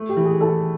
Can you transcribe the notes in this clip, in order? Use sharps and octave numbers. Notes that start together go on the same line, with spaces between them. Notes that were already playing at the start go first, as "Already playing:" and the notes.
Already playing: A3
G4
E3
G#4
E3 A4